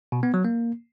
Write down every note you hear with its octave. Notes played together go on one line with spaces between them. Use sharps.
B2
B3
F#3
A#3